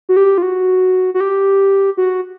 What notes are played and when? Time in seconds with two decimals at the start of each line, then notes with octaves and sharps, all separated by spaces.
0.09 F#4
0.16 G4
0.38 F4
0.42 F#4
1.14 F#4
1.20 G4
1.97 F#4